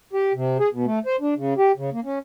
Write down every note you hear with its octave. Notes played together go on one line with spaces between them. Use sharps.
G4
C3
G#4
B2
A3
C5
D4
C#3
G4
C#3
A#3
C#4